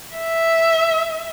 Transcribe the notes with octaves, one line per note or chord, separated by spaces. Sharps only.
E5